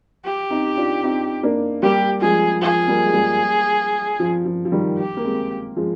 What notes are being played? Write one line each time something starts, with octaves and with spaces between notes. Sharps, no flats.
G4
C4 D#4
D4 F4
C4 D#4
A#3 D4
G3 A#3 G4
F3 G#3 G#4
F3 G#4
G3 A#3
G#3
G3 A#3
F3
F3
F3
D#3 G3
G4
A#3
G#3 C4
F3 G#3